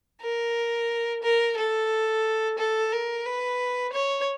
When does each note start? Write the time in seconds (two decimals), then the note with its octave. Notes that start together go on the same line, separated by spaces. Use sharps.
0.22 A#4
1.23 A#4
1.57 A4
2.58 A4
2.92 A#4
3.26 B4
3.93 C#5